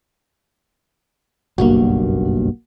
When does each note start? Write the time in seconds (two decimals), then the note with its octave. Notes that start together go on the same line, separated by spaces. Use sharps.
1.58 F#1 B1 G2 A#3 F#4